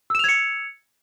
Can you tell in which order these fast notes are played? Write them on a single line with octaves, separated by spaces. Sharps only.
E6 E7 F7 G#6 C#7